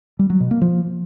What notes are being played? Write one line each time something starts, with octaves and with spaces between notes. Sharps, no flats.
G3
F#3
B2
A#3
F3